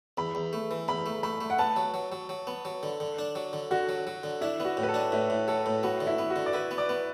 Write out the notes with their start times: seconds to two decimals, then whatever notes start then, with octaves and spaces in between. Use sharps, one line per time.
0.18 E2 B5
0.35 E2
0.53 A3
0.71 E3
0.88 E2 B5
1.06 A3
1.23 A3 B5
1.41 A3
1.50 F#5
1.59 B3 A5
1.76 F#3
1.94 F#3
2.12 F#3
2.29 F#3
2.47 B3
2.65 F#3
2.83 D3
3.00 D3
3.19 D4
3.35 F#3
3.53 D3
3.71 D3 F#4
3.89 F#3
4.07 F#3
4.23 D3
4.41 D4 E4
4.60 B3 F#4
4.77 A2
4.83 B4
4.89 A4
4.94 D4
5.12 A2 E4
5.30 A2
5.48 F#3 A4
5.66 A2
5.83 B3 F#4
6.00 D3
6.07 E4
6.19 B3
6.30 F#4
6.36 D3
6.46 D5
6.53 E4 B4
6.71 B3
6.78 D5
6.89 B3